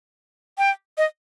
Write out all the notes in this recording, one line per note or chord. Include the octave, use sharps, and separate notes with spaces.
G5
D#5